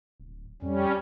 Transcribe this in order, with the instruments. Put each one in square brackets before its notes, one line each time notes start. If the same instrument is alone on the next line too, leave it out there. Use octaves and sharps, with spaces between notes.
[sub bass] D1
[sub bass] F2 [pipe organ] G3 C#4